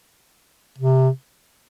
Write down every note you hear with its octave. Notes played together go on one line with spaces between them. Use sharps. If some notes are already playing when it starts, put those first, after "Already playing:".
C3